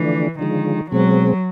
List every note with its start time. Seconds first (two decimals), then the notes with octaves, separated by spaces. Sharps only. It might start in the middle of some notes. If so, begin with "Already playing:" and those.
Already playing: D3 E3 F3 A3 D4
0.39 D3 D#3 F3 G#3
0.91 B2 F#3 G#3 C4